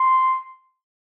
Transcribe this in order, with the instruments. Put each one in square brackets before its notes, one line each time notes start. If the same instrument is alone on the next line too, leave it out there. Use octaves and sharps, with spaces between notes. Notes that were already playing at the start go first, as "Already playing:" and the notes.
Already playing: [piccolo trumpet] C6